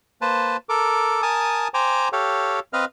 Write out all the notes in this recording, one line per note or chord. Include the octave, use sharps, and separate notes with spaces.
A#3 B4 C5 A5
A4 A#4 D6
A#4 G#5 A5 D#6
C5 G5 G#5 A#5 D6
G4 A4 C#5 F5 G5
C4 B4 D#5 F5 F6